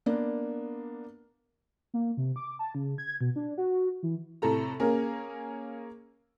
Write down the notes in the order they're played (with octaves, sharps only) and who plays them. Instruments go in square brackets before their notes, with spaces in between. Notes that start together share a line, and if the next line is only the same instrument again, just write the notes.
[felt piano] A#3 B3 D4
[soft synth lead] A#3
C3
D6
A5
C#3
G#6
B2
D4
F#4
E3
[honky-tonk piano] A2 C3 A4 A#5
A#3 C#4 G#4 A#4